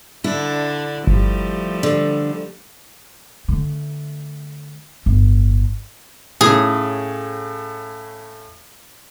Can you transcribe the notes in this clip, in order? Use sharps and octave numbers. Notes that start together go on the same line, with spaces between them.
D3 D4 E4
G1 F3 G3 A3
D3
D3 A3
G1 A2
A2 C#3 G#4